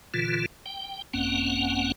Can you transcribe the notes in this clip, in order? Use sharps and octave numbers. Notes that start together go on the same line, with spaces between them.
A#2 D3 E3 F4
G5
G#1 F#2 A#3 C4 C#4 F#5